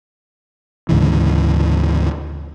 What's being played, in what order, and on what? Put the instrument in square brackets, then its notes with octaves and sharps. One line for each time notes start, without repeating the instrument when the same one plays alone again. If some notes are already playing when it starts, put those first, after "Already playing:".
[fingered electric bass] D2 G#2 C#3 E3